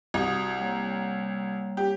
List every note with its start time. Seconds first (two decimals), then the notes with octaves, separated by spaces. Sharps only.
0.14 C2 F#4 D#6
0.59 G3 A#3 C#5
1.77 G4